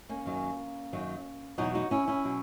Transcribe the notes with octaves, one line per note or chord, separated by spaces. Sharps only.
A#3 C#4
F#2 D#3 F#3
F#2 D#3 F#3
E2 B2 F#3 D#4 F#4
D#4 F#4
C#4 E4
C#4 E4
B2 F#3